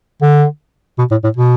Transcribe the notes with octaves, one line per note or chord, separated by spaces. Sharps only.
D3
B2
A2
A2
B2